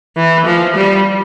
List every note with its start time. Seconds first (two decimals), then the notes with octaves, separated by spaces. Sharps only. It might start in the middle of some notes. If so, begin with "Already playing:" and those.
0.17 E3
0.46 F3
0.76 G3